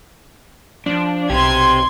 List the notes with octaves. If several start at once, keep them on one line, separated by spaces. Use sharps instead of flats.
F3 D4
B1 C4 G4 C6 G#6